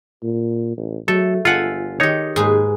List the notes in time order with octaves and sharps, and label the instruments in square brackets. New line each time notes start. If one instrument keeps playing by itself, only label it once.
[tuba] A#2
A1
[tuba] F#3 [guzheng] A3 [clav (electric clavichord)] A4
[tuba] G1 [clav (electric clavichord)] F4 F#5 [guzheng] A4 E5 G#5
[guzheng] D#3 G4 [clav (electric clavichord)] D#4 C#5
[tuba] D#2 [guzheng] G#2 G#4 B4